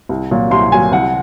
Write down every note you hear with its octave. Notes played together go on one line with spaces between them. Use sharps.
C2
A#2 F#3
C2 C6
A#2 F#3 G#5
C2 F#5